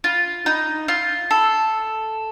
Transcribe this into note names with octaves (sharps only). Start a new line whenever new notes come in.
F4
D#4
F4
A4